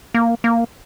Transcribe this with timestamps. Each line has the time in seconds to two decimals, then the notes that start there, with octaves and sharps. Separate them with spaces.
0.14 A#3
0.44 A#3